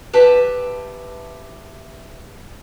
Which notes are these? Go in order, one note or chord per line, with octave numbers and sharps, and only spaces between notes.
G4 B4 E5 A5